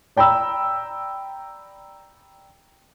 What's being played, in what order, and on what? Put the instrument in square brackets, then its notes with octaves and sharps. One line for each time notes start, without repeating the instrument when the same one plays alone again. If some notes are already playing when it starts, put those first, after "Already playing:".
[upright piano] D5 G5 A#5 B5 E6